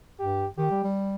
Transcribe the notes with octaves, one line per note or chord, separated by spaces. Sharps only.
G2 G4
D#3 G4
G3
G3